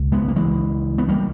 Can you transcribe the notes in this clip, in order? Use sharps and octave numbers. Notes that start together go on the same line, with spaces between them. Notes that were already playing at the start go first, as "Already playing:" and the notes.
Already playing: C#2 B2
G#3 B3
A#3
E3 G#3
B3
G3 A#3